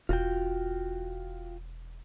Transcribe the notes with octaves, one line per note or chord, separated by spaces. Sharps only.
E1 F4 F#4 G5